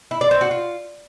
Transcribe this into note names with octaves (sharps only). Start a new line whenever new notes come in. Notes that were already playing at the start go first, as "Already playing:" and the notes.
E4
D5
C4
F#4
F4